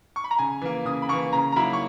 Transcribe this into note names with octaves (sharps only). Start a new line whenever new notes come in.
C#6
B5
A#5
C#3 G#5
E3 A#3
C#3 D#6
B5
E3 A#3 C#6
C#3 A#5
A#5
F#3 A#3 C#4 E4 B5
C#6